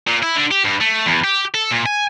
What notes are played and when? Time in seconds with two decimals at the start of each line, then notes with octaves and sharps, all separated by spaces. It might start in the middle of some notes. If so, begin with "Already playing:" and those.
0.07 A#2
0.23 E4
0.36 D3
0.51 G4
0.65 G2
0.81 A3
1.06 E2
1.24 G4
1.54 A4
1.71 A#2
1.86 G#5